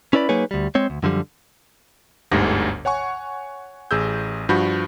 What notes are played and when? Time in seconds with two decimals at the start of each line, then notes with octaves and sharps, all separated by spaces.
0.13 C#4 E4 B4 D5 B5
0.29 F#3 A#3 D#4 G#4 B4 C#5
0.51 D2 G3
0.75 G#3 C4 C#5
0.90 D2
1.03 F#2 D3 F3 G3
2.32 G1 D2 G#2 G3 A#6
2.85 C#5 F#5 G#5 C#6
3.91 A1 G#4 E6 G6
4.49 G2 F3 F#4 B5 G6